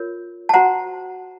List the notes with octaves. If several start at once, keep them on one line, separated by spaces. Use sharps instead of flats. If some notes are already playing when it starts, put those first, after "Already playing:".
Already playing: F4 A#4 C#5
A5
F#4 C5 F#5 A#5